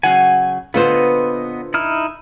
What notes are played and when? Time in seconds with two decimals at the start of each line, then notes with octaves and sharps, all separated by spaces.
0.03 C#3 F#3 F#5 G#5
0.74 A#2 D3 B3 F4 B4 C5 D#5
1.74 D#4 E4 F6